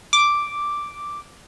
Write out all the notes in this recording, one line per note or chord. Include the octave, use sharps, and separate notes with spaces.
D6